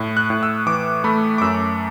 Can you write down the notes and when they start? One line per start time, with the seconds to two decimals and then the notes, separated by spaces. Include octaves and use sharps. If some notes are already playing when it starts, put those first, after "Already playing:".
Already playing: A2
0.17 F#6
0.30 A2
0.43 E6
0.66 E3 D6
1.04 A3 B5
1.38 D6
1.41 F#2 E6